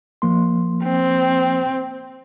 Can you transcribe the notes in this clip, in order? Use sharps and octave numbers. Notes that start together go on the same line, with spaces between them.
F3 A#3 C6
C4